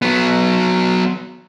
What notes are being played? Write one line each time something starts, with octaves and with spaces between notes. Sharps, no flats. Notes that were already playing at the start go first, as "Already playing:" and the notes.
F#3 B3